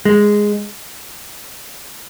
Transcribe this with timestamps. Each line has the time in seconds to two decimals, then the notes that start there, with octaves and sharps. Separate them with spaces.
0.05 G#3